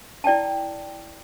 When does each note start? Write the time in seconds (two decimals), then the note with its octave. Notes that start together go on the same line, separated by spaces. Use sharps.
0.24 E4 D5 G5 A5